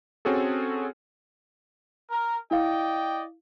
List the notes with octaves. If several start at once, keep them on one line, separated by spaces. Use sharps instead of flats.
C4 C#4 F#4 G#4 A4
A#4
E4 D5 D#5 F5 G5